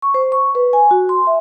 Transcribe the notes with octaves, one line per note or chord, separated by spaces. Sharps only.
C#6
C5
C#6
B4
G#5
F#4
C6
E5